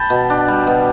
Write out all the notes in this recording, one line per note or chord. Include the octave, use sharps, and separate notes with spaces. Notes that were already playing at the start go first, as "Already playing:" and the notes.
Already playing: G5 A5 B5
B2
D4
G3
B2